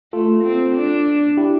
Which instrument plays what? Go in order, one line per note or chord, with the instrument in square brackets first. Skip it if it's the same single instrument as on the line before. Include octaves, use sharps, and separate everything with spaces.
[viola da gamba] A3 [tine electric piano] F4 A4
[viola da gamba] C4
D4
[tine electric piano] E4 G4